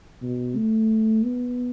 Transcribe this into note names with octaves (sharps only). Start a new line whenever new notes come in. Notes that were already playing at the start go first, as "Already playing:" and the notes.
B2
A3
B3